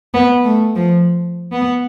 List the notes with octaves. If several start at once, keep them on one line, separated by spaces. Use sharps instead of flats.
B3
A3
F3
B3